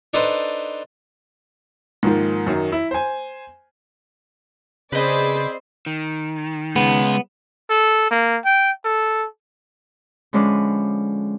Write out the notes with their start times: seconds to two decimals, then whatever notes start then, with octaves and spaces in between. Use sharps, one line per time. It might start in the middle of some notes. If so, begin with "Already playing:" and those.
0.14 D4 D#4 A4 B4 C5
2.03 G#2 D#3 F3 A#3
2.46 F#2 D#3 F#3
2.72 E4
2.91 C5 G#5
4.92 C#3 C4 G#4 B4 C5 D5 D#5 B5
5.86 D#3
6.76 C#3 G#3 B3
7.70 A4
8.11 A#3
8.45 G5
8.85 A4
10.33 D3 F3 G#3 C#4 B4 D5